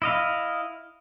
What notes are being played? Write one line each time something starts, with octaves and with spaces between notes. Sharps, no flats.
E4 D#5 F5